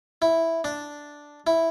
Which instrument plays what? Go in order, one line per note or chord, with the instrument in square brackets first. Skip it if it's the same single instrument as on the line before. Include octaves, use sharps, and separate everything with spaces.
[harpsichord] E4
D4
E4